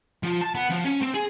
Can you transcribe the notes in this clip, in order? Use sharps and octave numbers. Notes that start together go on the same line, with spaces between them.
F3
A5
B3
F3
C#4
C4
G#4